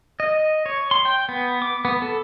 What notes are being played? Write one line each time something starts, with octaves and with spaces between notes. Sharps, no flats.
D#5
C#5
C6
G5
B3
D6
B3
A4